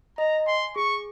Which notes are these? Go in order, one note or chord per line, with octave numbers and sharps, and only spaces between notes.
D#5 A#5
G#5 C6
G#4 C#6